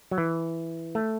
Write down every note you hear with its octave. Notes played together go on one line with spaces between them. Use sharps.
F#3
E3
A3